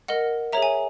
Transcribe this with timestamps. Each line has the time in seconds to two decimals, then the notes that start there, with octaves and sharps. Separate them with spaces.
0.08 A#4 D#5 F#5
0.53 G#4 C#5 E5 A#5
0.62 G#5